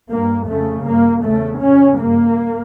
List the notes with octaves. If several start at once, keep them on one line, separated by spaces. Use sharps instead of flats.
G2 A#3
F2 C#3 A3
G2 A#3
E2 C#3 A3
F2 C#3 C#4
G2 A#3